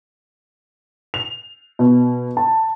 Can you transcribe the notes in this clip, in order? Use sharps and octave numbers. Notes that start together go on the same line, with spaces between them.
F7
B2
A5